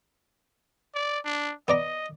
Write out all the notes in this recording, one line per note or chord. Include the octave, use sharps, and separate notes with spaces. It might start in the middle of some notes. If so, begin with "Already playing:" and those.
D5
D4
B3 D5 D#5 A#5